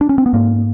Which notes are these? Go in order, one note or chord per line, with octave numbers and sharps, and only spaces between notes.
D4
C#4
C4
B3
G#2 A#3